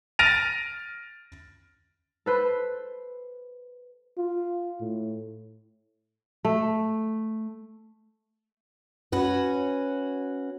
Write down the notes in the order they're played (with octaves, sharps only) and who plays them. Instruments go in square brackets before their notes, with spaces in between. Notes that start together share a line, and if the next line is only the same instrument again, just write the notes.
[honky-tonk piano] F6 A6 A#6 D7 D#7 F7
[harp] A4 B4 C5
[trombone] F4
A2
[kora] A3
[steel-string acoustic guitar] C#4 F#4 B4